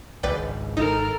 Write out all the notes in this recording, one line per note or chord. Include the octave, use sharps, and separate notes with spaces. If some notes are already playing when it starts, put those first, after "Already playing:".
G#1 C#2 G#2 B4 D5 G5
G#1 B2 G#3 D#4 A4 A#4